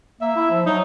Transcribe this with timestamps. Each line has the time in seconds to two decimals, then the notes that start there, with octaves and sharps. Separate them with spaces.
0.21 A#3 E5
0.36 E4
0.51 F3
0.66 F#3 D#4